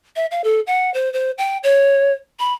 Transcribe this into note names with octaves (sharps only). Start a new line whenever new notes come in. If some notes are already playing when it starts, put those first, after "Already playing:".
E5
F5
A4
F#5
C5
C5
G5
C#5
B5